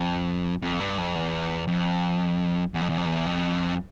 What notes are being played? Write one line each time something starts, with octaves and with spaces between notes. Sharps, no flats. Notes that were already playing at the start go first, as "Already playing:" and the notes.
Already playing: F2
F2
G2
F2
E2
F2
E2
F2
E2
F2
E2
F2